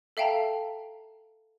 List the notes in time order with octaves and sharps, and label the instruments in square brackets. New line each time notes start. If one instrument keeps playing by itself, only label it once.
[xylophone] A4 E5 F5 G5 A5 A#5